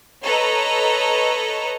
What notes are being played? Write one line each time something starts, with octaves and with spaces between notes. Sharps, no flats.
A4 B4 C#5 D#5 A#5